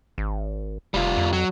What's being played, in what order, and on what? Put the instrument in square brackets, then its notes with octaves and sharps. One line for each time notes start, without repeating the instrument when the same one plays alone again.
[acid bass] G#1
[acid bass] F1 [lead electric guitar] G3 F4
[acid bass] F2
[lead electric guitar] F#3